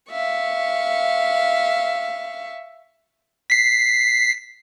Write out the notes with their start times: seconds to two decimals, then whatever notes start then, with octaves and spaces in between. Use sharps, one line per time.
0.10 E5 F5 C#6
3.50 B6 C7